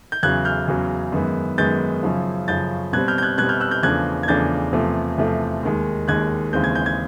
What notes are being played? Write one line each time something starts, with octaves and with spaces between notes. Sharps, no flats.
G6
E2 C#3 F#3 F#6 G#6
F6 G6
E2 C#3 F#3
F#2 D#3 G#3 B3
F#2 D#3 G#3 B3 G6 A6
F#2 C#3 F3
F#2 C#3 F3 G6 A6
B2 G3 C4 F#6 G#6
F6 G6
G6
F#6 G#6
B2 G3 C4 F#6 G#6
F6 G6
E6 F#6
F6 G6
E2 C#3 F3 A3 D4 F#6 G#6
G#6
E2 C#3 F3 A3 D4 G6 A6
E2 C3 F3 A3
E2 C3 F3 A3
D#2 D#3 G#3
D#2 D#3 G#3 F#6 G#6
D#2 C#3 E3 G#3 C4 G6
G#6
G6
G#6